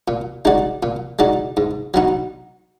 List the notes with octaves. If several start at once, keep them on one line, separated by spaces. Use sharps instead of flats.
A#2
G#3 D#4 F#4 D5
A#2
G#3 D#4 F#4 D5
G#2
F#3 B3 D#4 F#4